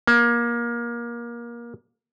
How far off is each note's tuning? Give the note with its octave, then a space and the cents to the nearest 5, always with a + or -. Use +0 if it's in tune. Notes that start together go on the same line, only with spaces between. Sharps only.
A#3 +25